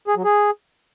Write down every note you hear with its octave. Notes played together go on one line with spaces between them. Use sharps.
G#4
F#3
G#4